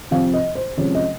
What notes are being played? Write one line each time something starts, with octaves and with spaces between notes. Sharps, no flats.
C3 F3 C4 F5
D#5
C5
C3 F3 G#3 C#4 C#5
D#5